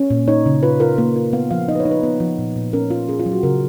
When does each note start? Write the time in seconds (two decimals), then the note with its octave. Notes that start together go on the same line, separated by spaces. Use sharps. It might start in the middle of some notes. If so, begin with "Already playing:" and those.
Already playing: C#4
0.10 A#2
0.28 D#4 C#5
0.46 C#3
0.63 F4 B4
0.80 F4 A#4
0.98 A#3 A#4
1.16 F4
1.33 B3 F5
1.51 F3 F5
1.68 D#4 D#5
1.75 B4
1.80 C#5
1.85 D#4
1.91 B4
2.03 B3
2.20 F3
2.38 A#2
2.56 A#2
2.73 C#4 A#4
2.90 F4
3.08 C#4 G#4
3.20 F4
3.26 F#3
3.32 F#4
3.43 C#3 A#4